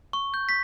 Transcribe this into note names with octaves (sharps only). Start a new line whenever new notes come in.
C#6
G6
B6